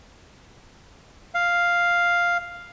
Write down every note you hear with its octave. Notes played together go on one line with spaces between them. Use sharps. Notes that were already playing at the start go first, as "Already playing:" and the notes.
F5